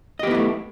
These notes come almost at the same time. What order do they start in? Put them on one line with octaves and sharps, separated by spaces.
D#5 G4 B3 E4 A3